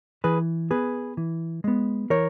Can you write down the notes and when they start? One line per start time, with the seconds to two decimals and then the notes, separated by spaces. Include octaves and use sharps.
0.24 E3 G#4 B4
0.71 B3 G#4 B4
1.17 E3
1.64 G#3 B3
2.10 E3 A#4 C#5